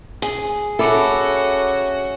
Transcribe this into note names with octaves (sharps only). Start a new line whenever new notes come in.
G#4
C#4 F#4 A4 E5 B5 D6